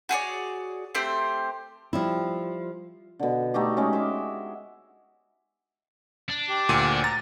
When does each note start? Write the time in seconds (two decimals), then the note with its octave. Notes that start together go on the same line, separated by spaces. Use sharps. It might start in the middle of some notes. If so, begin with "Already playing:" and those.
0.09 F#4 G#4 C#5 D5
0.95 A3 C4 G4 C5
1.93 F3 G3 E4
3.19 B2 D3
3.54 A3 D#4 F#4 G4
3.77 G#3 C#4
3.93 E5 C6 D6
6.29 D4
6.49 G4
6.69 D2 A#2 D#7
7.04 A#5 A6